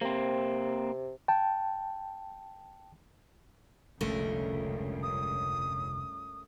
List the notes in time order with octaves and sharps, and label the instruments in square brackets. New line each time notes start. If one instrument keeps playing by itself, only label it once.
[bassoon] C3 [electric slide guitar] A#3 C4
[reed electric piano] G5 A5
[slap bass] F1 D3 [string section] C#2 G2 [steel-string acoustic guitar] A3 C#4 A#4
[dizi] D#6